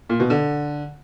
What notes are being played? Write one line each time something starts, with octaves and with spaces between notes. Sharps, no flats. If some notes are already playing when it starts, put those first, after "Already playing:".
A#2
B2
D3